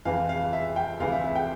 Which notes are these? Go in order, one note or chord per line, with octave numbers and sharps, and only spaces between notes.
F2 E3 F5
F5
E5
G5
D2 C3 E3 F5
E5
E5
G5